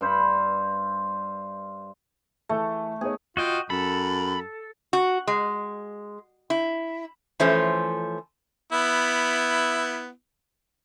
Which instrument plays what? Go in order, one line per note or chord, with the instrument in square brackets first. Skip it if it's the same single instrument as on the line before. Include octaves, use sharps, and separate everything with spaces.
[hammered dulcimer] G2 C5 B5
[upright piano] E3 A4 [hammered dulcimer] A3
[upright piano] B3 D#4 C#5 [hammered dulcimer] G#4
[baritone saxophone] F4 [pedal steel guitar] F#4 D#5 G5
[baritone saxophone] F#2 [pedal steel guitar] A4 [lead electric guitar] B5
[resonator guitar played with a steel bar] F#4
G#3
E4
E3 F3 A3 C#4 C5
[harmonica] B3 E4